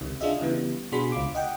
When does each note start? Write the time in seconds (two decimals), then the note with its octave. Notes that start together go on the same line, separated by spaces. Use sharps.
0.01 C#2 C3 D#3
0.21 D4 F4 G#4 D#5 E5
0.40 C#3 E3 G3 B3
0.92 B2 D4 F#4 G#4 B5 C6
1.12 C#2 F4 D6
1.35 D#5 F#5 G5